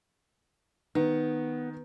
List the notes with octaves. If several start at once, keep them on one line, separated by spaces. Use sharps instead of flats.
D#3 B3